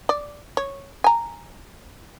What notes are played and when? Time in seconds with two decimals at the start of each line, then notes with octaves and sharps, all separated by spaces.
0.09 D5
0.57 C#5
1.04 G#5 A#5